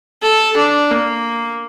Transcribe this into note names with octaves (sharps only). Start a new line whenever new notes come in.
A4
D4
A#3